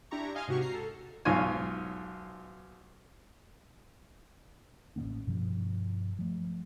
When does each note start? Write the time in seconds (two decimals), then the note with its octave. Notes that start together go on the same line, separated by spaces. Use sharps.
0.11 D4 E4 G4 A#5 C#6
0.35 D#5 F5 G#5 C6 F6
0.48 G#2 C3 F#4 G4 C#6
0.61 A#5 C7
0.74 A4
1.25 B1 G#2 F4 C#5 G#5
4.96 A1 D3 A#3 C#4
5.27 G2 B2 F3
6.19 F3 A3